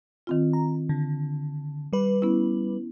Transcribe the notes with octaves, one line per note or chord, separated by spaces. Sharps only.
D#3 C4 F4
A#5
D3
G3 B4
B3 C#4 E4